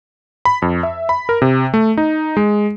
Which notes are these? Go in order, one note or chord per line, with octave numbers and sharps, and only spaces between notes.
B5
F2
E5
B5
A#4
C3
A3
D#4
G#3